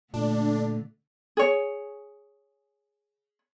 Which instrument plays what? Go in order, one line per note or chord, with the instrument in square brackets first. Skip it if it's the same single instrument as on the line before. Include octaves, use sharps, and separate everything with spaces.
[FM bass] A#2 [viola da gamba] D3 A3 [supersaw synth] D4
[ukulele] G#4 C#5